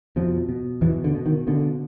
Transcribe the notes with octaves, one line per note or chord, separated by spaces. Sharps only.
F2 B2 F3
B2
E2 B2 E3
D3
B2
D#3
B2 D3